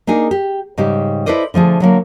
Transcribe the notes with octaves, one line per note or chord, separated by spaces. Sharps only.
A#3 D4 D#4 G#4
G4
G#2 C#3 G3 G4
E4 A4 B4 C5 D5 D#5
D3 F3 A3 G#4
D3 F#3 A#3